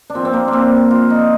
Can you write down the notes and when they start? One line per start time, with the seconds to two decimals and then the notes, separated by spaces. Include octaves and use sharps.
0.10 D4
0.15 A#2 F3 C4
0.25 C4
0.33 A#3
0.48 D4
0.53 C4
0.91 F4
1.10 D#4